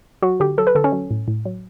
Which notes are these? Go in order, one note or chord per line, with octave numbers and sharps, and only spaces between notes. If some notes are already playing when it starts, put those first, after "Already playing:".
F#3 F#4
D3 G4
F#3 A4
B4
D3 A4
C#4
F#3
A2
A2
F#3